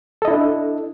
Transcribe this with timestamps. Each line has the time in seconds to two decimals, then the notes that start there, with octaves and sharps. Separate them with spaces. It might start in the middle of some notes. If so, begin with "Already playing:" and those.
0.22 A4
0.25 D#5
0.28 E4
0.31 D4